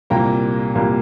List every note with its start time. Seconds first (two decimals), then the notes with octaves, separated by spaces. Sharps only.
0.10 C2 A#2 G3 A#3 G5 A#5
0.75 C2 A#2 G3 A#3